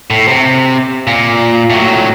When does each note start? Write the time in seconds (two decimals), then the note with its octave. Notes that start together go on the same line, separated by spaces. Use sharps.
0.10 A2
0.28 C3
1.07 A#2
1.70 A2 F#3